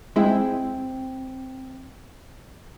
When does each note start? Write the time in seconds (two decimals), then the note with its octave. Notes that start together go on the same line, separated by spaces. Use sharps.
0.16 G#3 C4 E4 G5